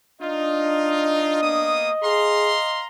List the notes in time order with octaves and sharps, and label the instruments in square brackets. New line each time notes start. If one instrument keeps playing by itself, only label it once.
[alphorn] D4 [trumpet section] D#4 F4 [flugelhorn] D#5
[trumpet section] A#3 B3 D#6
[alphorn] G#4 [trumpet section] F5 A#5 C6